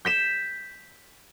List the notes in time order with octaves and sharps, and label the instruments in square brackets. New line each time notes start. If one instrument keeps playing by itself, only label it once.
[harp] G6 B6 E7